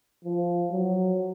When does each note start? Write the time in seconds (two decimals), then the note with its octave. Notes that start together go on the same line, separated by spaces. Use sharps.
0.25 F3
0.72 F#3